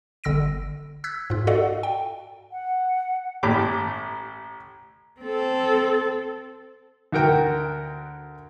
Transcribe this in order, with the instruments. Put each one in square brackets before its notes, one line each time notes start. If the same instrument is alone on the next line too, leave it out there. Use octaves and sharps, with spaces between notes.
[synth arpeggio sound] G1 D3 E6 A#6 D7
E6 F#6 G#6 B6
G#2 F4
F#4 A4 D5 D#5 F5 F#5
G5
[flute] F#5
[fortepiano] A1 A2 G4 D6
[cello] C4 A4
[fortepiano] D2 F#4 A#4 G5